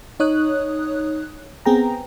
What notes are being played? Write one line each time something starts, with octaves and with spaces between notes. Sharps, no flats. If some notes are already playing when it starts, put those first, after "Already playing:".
D#4 C#5 D#6 F#6
B3 C4 G#4 G5 A#5